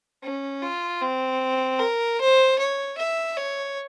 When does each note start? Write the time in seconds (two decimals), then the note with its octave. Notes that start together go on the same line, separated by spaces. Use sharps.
0.23 C#4
0.62 F4
1.02 C4
1.80 A#4
2.19 C5
2.58 C#5
2.98 E5
3.37 C#5